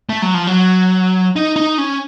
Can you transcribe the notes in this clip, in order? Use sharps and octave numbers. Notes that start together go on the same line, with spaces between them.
A3
F#3
F3
F#3
D#4
D#4
C#4